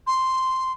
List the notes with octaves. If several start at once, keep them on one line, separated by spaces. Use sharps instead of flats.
C6